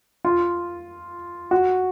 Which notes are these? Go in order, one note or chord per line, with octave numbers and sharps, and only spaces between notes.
F4
F#4